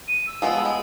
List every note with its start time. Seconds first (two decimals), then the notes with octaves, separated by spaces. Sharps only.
0.08 D#7
0.27 E6
0.42 F3 G#3 B3
0.65 G#3